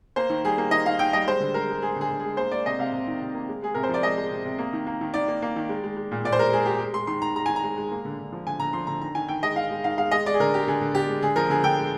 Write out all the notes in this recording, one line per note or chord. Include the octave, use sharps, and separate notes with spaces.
A#3 C5
D#3
G3 G#4
A#3
D#3 D#5
D#3 F5
D#3 G5
G3 D#5
G#3 C5
D3
G#3 A#4
G#3
G#3 G#4
D3 G#4
D3
G#3 G#4
A#3 C5
A#3 D5
C3 D#5
C3 F5
C3
D#3
C3
A#3
G#3
G#3 G#4
C3 A#4
C5
F3 D5
G#3 D#5
G#3
C3
C3
A#3
D#3
A#3
D#3
D#3 D5
A#3
A#3
D#3
G#3
G#3
G#3
A#2
A#2 D5
C5
G#3 A#4
G#3 G#4
G#3 G4
G#3
G#3 C6
D#3 C6
D#3 A#5
G#3 A#5
D#3 G#5
A#5
G#3
G#3
A#3
D3
D3
F3
D3 G#5
D3 A#5
F3 C6
D3 A#5
D#3 A#5
D#3 G#5
D#3 G5
G#3 D#5
D#3 F5
G#3
D#3 F5
G#3 F5
G#3 D#5
G#3 D5
G#4
D3 A#4
G#3 G4
D3 G#4
D3
D3 G4
G#3
D3 G#4
F3 A#4
D3 G#4
D3 G5
G#3